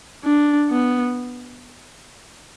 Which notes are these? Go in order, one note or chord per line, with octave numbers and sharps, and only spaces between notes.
D4
B3